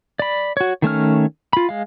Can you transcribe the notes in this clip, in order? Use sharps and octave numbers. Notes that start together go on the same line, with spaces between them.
D5 B5
F#4 C#5
D#3 A3 C#4 F6
F4 B5
G#3 F5